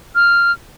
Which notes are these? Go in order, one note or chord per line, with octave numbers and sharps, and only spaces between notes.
F6